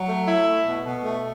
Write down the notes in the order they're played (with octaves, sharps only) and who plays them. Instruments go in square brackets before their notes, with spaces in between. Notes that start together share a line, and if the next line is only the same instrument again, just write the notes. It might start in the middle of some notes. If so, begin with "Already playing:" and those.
Already playing: [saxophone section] F#3
A3
E4
A3
B2
B2
A3